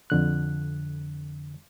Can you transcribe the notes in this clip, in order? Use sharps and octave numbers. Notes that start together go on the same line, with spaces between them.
F2 D3 F#6